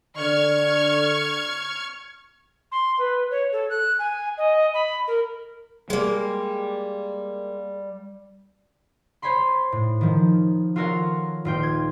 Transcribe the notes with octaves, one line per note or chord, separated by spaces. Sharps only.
D3 D5 C#6 F6 G#6
C6
B4
C#5
A4
F#6
G#5
D#5
B5
A#4
G3 G#3 A#3
C5 C#5 G#5 B5 C6
A2
D#3 F3
F4 F#4 A4 A#4 C#5 F5
D#1 F4 G5
G#6